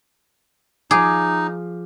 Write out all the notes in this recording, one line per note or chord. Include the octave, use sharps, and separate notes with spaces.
F3 D#4 G#4 F5 D6